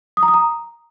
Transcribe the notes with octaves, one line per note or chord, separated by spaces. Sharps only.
D#6
A#5
D#6
A#5